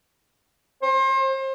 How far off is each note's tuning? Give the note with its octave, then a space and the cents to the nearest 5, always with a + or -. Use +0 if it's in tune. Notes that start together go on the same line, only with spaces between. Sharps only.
C5 +35